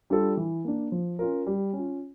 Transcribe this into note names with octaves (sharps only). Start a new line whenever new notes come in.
G3 D4 F4 A4
E3
A#3 D4
F3
C#4 F4 A#4
G3
C#4
F4